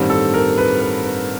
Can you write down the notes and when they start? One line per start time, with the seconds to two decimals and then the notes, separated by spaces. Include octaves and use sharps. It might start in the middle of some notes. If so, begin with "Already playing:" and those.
Already playing: A1 G2 D#3 G3 C4
0.10 A4
0.34 A#4
0.58 B4
0.81 B4
1.04 B4